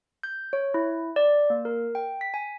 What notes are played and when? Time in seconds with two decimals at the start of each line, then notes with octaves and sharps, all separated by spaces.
0.23 G6
0.53 C#5
0.74 E4
1.16 D5
1.50 A#3
1.65 A#4
1.95 G5
2.21 B6
2.34 G#5